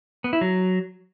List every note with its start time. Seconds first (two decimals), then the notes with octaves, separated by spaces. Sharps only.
0.24 B3
0.33 E4
0.41 F#3